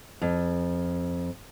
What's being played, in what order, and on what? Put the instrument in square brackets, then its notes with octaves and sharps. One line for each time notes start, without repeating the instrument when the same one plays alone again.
[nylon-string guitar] F2